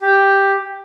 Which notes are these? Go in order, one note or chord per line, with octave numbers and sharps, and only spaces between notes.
G4